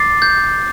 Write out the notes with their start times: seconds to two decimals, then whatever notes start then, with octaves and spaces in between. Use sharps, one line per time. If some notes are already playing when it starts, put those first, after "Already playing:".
Already playing: D6 A6 C7
0.22 G6